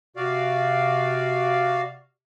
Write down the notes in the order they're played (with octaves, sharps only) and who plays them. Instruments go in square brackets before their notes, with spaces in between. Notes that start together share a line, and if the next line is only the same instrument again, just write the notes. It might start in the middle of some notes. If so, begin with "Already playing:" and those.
[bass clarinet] C3 [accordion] F#4 D5 F5